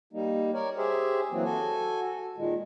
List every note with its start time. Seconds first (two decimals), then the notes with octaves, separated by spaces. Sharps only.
0.13 G3 A#3 D#4
0.54 A#4 C#5 D5
0.78 G4 G#4 C5 E5
1.31 E3 F#3 A#3 C4
1.44 F#4 A4 G#5
2.38 A#2 D#3 G#3